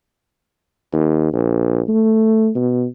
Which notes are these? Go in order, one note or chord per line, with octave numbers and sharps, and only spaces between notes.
D#2
A#1
A3
B2